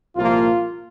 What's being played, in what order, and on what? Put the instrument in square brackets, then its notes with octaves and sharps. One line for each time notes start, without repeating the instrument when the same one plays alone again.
[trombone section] C2 A#2 F3 A#3 F4